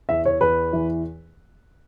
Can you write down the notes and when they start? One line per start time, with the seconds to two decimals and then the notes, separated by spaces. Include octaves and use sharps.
0.09 E2 E5
0.25 C#5
0.40 E2 B4
0.73 E3